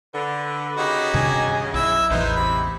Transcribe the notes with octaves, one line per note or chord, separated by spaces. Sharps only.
D3 B4
C#3 D#4 F#4 G4 D#5
G2 C3 D#3 G#5
B1 E4 E5
A1 E2 B3 D#4 E4 B4 C5
C3 B5